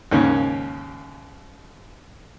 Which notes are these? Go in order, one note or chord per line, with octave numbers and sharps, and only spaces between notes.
D#2 G#2 C#3 A#3 C#4